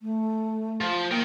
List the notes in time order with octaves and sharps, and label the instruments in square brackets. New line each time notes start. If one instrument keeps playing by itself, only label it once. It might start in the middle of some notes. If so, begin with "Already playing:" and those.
[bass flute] A3
[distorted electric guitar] F3
[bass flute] A#3 [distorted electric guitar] A#4 G5